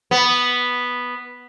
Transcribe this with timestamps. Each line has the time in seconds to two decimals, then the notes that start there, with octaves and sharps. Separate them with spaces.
0.11 B3